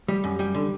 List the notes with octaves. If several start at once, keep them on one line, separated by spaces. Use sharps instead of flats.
G3
F#2
G3
D3